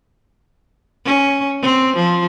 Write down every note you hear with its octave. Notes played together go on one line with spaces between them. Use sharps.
C#4
C4
F3